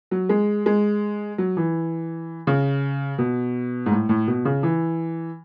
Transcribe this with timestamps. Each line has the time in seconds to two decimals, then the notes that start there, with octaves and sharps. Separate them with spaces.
0.11 F#3
0.29 G#3
0.66 G#3
1.38 F#3
1.57 E3
2.47 C#3
3.18 B2
3.86 G#2
3.91 A2
4.09 A2
4.28 B2
4.45 C#3
4.63 E3